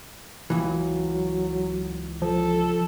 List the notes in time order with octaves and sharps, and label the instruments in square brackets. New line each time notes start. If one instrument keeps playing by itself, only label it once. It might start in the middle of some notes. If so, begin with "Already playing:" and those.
[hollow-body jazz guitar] C#2 E3 [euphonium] F#3
[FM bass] F3 [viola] A4